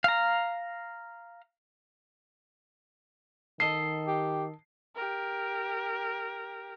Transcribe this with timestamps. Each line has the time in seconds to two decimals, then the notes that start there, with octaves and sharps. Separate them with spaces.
0.04 F5 A#5
3.60 D#3 A4 D#5 C7
4.08 G4
4.95 G4 A#4